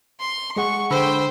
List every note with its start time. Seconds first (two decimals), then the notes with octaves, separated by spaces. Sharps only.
0.20 C6
0.56 G#3 G#4 F#5 C#6
0.91 D3 C5 G5 B5 E6